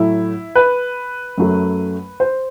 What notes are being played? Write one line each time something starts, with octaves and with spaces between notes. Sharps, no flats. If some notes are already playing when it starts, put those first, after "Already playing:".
Already playing: A2 F#3 A3 E4
B4
F#2 F#3 A3
C5